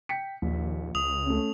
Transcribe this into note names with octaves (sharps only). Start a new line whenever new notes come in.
G5 B6 C#7
A#1 D#2
C#2 D#6 F7
A3 C#4